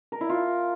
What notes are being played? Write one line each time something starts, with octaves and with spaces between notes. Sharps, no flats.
A#4
E4
F4